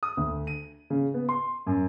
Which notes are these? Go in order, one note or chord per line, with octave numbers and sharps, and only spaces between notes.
D#6
D2
D#7
C#3
B3
C6
F#2